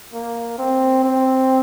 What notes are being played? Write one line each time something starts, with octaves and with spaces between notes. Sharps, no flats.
A#3
C4
C4